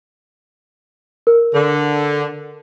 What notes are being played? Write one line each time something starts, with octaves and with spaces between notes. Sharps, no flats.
A#4
D3